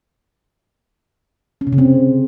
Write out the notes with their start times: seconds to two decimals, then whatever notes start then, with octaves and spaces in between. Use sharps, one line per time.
1.61 C#4
1.67 C3
1.73 C#3
1.78 C4